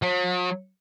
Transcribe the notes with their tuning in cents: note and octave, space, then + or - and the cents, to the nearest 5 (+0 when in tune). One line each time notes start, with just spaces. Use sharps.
F#3 -45